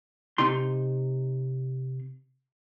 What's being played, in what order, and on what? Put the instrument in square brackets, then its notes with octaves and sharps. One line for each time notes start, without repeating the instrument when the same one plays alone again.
[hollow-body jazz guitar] C3 D#4 C6